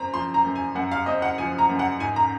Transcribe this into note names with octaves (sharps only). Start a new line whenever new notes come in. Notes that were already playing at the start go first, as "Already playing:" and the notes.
Already playing: F#2 C4 A#5
F3 C6
A#5
F#2
G#5
F#2 F#5
F5
C4 D#5
F#5
F3 G#5
A#5
F#2
F#5
G#2 G#5
A#5